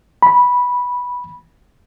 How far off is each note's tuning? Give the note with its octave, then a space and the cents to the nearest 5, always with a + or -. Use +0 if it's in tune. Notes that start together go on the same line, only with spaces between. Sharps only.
B5 -10